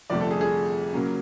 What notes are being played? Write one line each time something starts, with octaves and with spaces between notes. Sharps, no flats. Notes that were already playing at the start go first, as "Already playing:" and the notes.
G1 F2 C3 F3 A3 D5
A4
G#4
G#4
C#3 F#3 A#3 C#4